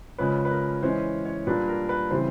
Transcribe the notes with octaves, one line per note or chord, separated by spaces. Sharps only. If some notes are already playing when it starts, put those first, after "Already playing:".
C#3 F3 G#3 C#4 B4
B4
A#4
E3 G#3 C#4 C5
C#5
A#2 G3 A#3 D4 B4
A#4
B4
C#3 E3 G3 C4 C5